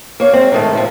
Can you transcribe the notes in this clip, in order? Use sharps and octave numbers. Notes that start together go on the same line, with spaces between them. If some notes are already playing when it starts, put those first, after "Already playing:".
A#3 C#5 F5
G#3 C4
G#2 D#3 A3
A2 E3 F3